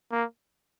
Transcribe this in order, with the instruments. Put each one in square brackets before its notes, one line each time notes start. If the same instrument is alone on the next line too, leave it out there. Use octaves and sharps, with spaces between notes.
[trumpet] A#3